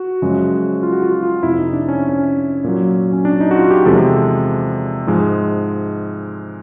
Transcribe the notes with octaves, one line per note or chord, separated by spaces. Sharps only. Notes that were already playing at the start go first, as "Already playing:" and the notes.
Already playing: F#4
F#2 C#3 F3 G#3
F4
F#4
F4
F#4
F4
F2 C3 F3 E4
D#4
D4
C#4
C#4
A#2 F#3
C#4
D4
D#4
F#4
F4
G4
E2 C3 F3 G#3 A4
G#2 F3 G#3